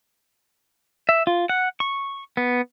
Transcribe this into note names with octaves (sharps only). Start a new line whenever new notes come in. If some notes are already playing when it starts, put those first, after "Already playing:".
E5
F4
F#5
C#6
B3